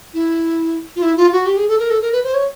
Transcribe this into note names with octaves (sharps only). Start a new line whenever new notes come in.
E4
F4
E4
F4
F#4
G4
G#4
A4
A#4
A4
A#4
B4
C5
C#5